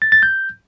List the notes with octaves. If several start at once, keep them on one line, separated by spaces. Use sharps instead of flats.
A6
A6
G6